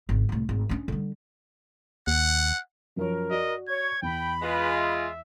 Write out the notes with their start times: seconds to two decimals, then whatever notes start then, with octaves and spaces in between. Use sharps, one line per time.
0.09 G#1 C#3
0.29 C2 A2
0.49 G#1
0.69 C#4 D4
0.88 D3 G3
2.07 D#2 F#5
2.96 F#2 F3 A#4 C#5
3.31 F#4 D5 D#5
3.68 C#5 C#6 G#6
4.02 E2 G5 B5
4.42 G#3 F4 B4
4.77 E5